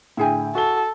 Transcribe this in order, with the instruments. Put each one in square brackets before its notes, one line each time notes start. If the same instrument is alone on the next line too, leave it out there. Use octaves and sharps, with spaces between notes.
[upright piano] A2 D3 G5 [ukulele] E4 G#4 G#5
[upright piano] F#4 G7 [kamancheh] A4